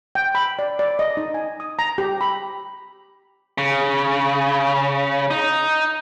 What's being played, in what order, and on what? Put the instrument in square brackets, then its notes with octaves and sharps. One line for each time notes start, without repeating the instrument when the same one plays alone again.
[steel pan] G5
B5
D5
D5
D#5
D#4
G#5
D#6
A#5
G4
B5
[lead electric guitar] C#3
D#4